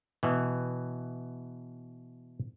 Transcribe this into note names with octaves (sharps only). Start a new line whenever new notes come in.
B2 E3